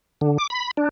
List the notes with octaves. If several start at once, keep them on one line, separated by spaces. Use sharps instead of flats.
D3
D6
B5
D4